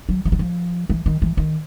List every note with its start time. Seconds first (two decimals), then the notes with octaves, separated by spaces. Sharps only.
0.09 F#3
0.25 F3
0.32 F#3
0.39 F3
0.90 E3
1.06 D#3
1.22 E3
1.37 D#3